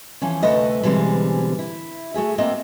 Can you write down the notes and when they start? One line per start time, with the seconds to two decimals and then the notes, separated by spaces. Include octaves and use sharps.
0.21 E3 F3 C#4
0.42 D2 C3 A3 B4 D#5 E5
0.83 B2 D3 E3 G3 G#3 C4
1.59 E4
2.14 A3 F#4 G#4 E5
2.38 A#3 C4 D4 D#5 E5